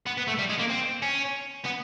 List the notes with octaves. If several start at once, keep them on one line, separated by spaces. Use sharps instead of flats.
B3
B3
A3
G3
G#3
A#3
C4
C#4
B3